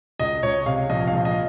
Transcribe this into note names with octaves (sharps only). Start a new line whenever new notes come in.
C#2 D#5
C#2 C#5
C3 F5
A#1 D#5
F5
A#1
D#5